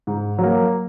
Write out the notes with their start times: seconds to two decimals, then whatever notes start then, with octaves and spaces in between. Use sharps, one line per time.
0.07 G#2
0.39 F#3 A#3